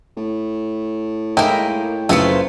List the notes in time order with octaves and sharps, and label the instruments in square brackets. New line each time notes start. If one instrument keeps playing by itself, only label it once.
[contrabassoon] A2
[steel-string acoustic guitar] G#3 A#4 [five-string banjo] A#3 D#4 E4 [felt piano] G5
[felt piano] F#1 C#7 [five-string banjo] A3 G#4 [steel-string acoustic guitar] F4 B4 C5